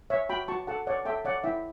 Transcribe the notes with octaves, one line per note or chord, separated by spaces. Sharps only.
C#5 E5
F#4 G5 B5
F#4 A5 C#6
A4 F#5 A5
C#5 D5 F#5
A4 E5 G5
C#5 D5 F#5
E4 E5 G5